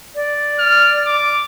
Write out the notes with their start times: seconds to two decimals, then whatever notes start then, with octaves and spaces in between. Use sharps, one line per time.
0.15 D5
0.59 F6
1.06 D6